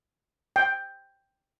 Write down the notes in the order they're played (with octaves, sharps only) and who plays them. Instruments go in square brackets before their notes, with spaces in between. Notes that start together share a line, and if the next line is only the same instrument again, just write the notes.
[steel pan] G5